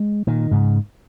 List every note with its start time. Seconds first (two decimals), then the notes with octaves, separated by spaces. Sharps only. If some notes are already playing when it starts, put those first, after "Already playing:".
Already playing: G#3
0.27 A#2 D#3
0.51 G#2 C#3